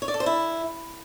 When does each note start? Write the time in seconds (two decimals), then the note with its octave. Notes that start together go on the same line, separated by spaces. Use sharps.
0.02 C#5
0.08 D5
0.14 A4
0.20 C5
0.26 E4